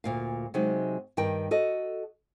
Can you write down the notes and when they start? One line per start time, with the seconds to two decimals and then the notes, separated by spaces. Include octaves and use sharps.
0.04 D2 A#2 F5
0.54 C3 F#3 G#3 D#4
1.17 G2 D#3 A#4 G5
1.51 F#4 A4 D#5